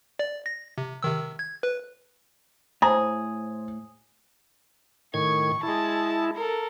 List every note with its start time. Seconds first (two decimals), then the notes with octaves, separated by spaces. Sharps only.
0.19 D5
0.46 A#6
0.78 C3
1.03 C3 D#3 E6
1.39 G#6
1.63 B4
2.82 A2 G#4 C5 A5 A#5
5.14 A2 D#3 C#6 G#6
5.63 G#3 E4 A5
6.36 A4 A#4